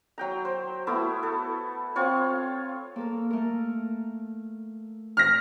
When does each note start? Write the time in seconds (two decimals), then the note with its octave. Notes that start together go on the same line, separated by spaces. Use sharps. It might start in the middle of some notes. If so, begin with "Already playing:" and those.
0.18 F#3 G5 A#5
0.45 C5
0.87 A3 B3 E4 F#4
1.23 A4
1.96 C4 F4 C#5
2.96 A#3 A4 A#4
3.30 A3 A#4
5.17 F6 A#6